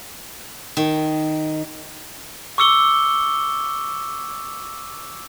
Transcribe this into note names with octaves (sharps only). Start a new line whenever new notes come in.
D#3
C#6 D6 E6 C#7 G7